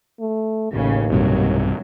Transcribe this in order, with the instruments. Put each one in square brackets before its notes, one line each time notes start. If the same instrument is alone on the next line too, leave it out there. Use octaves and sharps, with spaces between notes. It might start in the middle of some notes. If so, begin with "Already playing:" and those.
[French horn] A3
[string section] A1 C#3 [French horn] D#2
[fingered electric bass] B1 G2 C3 [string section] F#3